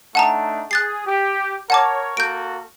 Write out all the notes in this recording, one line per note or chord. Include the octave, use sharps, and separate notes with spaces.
A3 D4 D#4 F#5 A5 A#5
G#4 F#6 A6 C7
G4
A#4 C#5 F#5 A5 D6
A#3 F#4 A4 G6 D7